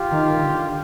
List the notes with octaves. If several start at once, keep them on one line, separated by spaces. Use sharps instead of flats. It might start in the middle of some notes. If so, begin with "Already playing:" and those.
Already playing: F4 G4
D#3
D3